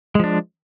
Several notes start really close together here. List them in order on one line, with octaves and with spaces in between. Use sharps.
G#3 F3 D4